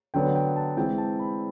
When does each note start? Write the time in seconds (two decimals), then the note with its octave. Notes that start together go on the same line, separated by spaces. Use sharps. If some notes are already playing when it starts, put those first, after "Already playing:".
0.14 D3 F#3 B3 G5
0.36 G5
0.56 A5
0.77 E3 G#3 C4 G5
0.98 A5
1.19 B5